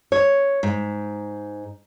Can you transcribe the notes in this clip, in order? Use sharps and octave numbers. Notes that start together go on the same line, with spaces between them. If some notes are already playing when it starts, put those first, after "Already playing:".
C#5
G#2